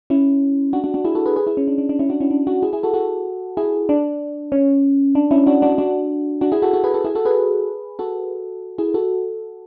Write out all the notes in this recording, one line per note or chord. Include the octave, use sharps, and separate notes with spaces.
C#4 E4
D4 F#4
D4 F#4
D4 F#4
E4 G#4
F#4 A4
G#4 B4
G#4 B4
E4 G#4
C#4
D4
D4
D4
C#4 E4
D4 F#4
C#4 E4
D4
D4 F#4
E4 G#4
E4 G#4
F#4 A4
F#4 A4
E4 G#4
D4
C#4
D4
C#4 E4
D4 F#4
D4 F#4
D4 F#4
D4 F#4
E4 G#4
F#4 A4
F#4 A4
G#4 B4
F#4 A4
E4 G#4
F#4 A4
G#4 B4
F#4 A4
E4 G#4
F#4 A4